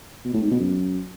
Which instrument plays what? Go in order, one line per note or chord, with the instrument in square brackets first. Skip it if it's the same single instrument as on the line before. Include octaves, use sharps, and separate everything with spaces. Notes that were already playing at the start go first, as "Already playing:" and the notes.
[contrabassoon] B2
A2
G#2
B2
F#2